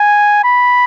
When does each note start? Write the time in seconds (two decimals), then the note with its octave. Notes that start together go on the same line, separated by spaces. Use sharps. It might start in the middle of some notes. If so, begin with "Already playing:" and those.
Already playing: G#5
0.44 B5